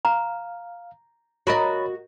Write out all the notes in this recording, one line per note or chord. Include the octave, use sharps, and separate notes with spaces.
F5 A#5
F#4 A#4 C#5 D#5 B5 A6